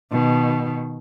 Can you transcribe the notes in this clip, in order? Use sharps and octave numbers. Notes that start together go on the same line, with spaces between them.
B2 D#3